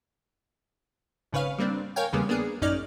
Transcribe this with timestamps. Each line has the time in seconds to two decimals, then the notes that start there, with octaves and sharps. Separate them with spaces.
1.32 G#1 C#3 B4 C#5 F5
1.59 G3 A#3 C4 D4
1.96 A#4 C#5 F5 G5 G#5
2.13 E2 C#3 G3 G#3 A#3 B3
2.29 A#3 B3 D4 G#4
2.61 A1 F#2 C#4 D#4 D5 F6